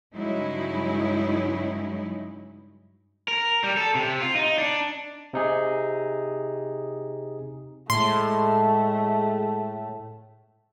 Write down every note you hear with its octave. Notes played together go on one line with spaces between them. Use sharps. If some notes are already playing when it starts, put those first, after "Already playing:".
G2 C#3 F#3 G#3 D#4 E4
A#4
G3
A4
C3
F4
D#4
D4
C3 D#4 G#4
A2 G#3 A3 C6